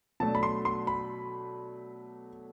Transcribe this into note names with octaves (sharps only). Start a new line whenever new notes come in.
B2 F#3 A3 D4 A5
B5
C6
C6
B5